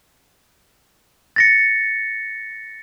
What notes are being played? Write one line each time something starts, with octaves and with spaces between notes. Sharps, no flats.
A6 A#6 C#7